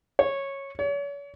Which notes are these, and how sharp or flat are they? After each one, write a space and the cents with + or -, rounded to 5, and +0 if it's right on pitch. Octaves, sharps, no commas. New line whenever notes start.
C#5 -10
C#5 +40